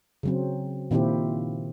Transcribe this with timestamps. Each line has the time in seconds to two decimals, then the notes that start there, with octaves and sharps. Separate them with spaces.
0.23 C#3 F#3 C4
0.91 A#2 D#3 C4 E4 F4 G4